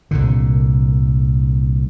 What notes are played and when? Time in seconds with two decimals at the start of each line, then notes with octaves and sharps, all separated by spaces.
0.11 C2 A#2 D3